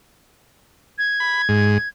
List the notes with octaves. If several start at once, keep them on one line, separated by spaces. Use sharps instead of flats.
G#6
B5
G#2